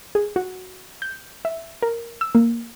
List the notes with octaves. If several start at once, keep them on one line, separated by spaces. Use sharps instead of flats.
G#4
F#4
G6
E5
A#4
E6
A#3